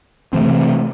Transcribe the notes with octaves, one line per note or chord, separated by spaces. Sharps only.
C3 E3 A3 C4